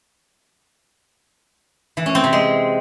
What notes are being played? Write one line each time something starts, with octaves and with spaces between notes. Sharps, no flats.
E3
C#4
C4
C3
G#3